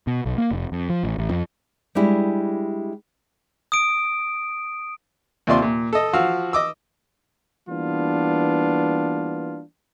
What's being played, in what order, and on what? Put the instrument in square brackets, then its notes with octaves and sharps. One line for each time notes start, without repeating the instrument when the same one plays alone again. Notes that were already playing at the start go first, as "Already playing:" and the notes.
[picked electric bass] B2
B1
A#3
F1
F2
F3
A1
A1
F2
[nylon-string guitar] G3 G#3 D4 E4 G4
[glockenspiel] D#6 D7
[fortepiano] D#2 C3 F4 D5 C6
A#2
A4 D#5
F3 F#4 F5 E6
D#5 D6 E6
[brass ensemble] E3 G3 A#3 B3 D4 F4